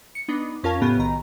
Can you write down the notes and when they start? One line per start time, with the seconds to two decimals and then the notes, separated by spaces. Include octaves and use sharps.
0.15 C#7
0.28 B3 D4 D#4
0.64 F2 C#4 F4 A#4 F5 A5
0.81 A2 C#3 B3 G4
0.98 B1 D#3 A#5